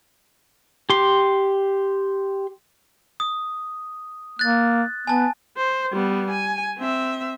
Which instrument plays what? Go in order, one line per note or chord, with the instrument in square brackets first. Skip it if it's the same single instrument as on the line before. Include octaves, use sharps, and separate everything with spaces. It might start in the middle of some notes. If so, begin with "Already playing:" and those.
[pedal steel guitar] G4 C6
[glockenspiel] D#6
[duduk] A#3 [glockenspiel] F#6 A6
[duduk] B3 [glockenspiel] G#5 A5
[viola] C5
G3 B3
G#5
C4 E5